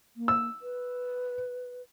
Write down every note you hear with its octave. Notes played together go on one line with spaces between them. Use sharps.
A#3
E6
B4